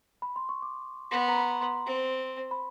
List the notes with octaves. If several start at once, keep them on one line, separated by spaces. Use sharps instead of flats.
B5
C6
C#6
D6
B3 C6
A#5
B5
C6
C4
B5